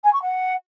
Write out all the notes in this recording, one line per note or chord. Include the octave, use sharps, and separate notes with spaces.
G#5
C#6
F#5